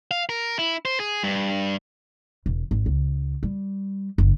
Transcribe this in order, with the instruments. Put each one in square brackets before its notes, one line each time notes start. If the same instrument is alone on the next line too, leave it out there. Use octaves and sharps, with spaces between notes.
[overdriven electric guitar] F5
A#4
E4
C5
G#4
G2
[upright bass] E1
G#1
C#2
G3
F#1